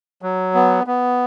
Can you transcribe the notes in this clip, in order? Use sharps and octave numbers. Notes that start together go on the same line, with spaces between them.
F#3
B3
B3